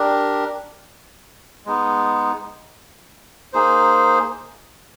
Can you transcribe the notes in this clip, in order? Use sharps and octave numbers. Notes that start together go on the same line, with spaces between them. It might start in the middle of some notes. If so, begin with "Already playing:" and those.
Already playing: D4 G4 A#4
G#3 B3 D#4
A#3 D#4 G#4 C5